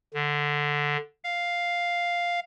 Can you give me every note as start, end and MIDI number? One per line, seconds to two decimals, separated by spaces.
0.14 0.97 50
1.24 2.40 77